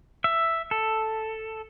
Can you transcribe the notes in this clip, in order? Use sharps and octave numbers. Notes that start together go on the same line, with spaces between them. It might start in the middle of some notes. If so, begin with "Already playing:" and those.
E5
A4